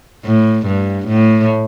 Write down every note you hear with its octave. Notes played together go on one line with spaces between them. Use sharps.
A2
G2
A2